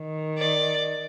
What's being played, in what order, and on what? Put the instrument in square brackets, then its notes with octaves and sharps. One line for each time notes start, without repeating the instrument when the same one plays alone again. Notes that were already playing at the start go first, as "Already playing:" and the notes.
Already playing: [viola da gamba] D#3
[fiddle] D5